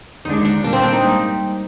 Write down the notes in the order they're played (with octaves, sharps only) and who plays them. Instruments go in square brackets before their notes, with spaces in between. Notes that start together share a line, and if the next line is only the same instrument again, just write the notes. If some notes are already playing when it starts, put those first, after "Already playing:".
[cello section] D#2 D3 G#3 D4 [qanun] D#4
[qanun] D4
[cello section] A#2 G3 A#3 [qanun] D4
[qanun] C4
D4
D#4
[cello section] G#2 G3 A#3